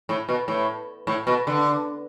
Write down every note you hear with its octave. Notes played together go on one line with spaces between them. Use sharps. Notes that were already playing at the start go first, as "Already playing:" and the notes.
A2
B2
A2
A2
B2
D3